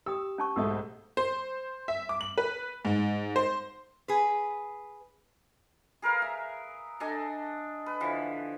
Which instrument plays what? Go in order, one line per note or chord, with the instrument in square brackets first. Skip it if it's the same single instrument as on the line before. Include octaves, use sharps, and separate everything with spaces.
[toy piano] G4 G5 D#6 [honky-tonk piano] E6
[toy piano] C#4 A5 C#6
[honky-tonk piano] B1 G#2 A3 [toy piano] D#6 E6
[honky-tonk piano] C5
E5
D6
F#7
B4
G#2
C5
[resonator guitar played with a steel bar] G#4 B4
[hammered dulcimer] G#4 A#4 B4 F5
E5
D4 A4 D#5 G#5
B4
D3 E3 F3